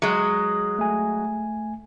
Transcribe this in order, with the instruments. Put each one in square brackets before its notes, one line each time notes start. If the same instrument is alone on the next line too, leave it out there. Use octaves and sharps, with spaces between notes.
[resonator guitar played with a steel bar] F#3 G#3
[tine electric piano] A3 G#5